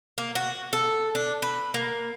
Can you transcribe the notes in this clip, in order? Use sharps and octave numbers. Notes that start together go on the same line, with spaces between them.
A#3
F#4
A4
D4
B4
A#3